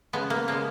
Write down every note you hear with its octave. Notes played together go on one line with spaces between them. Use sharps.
C#3 F3 G#3 B3
A#3
C#3 F3 G#3 A#3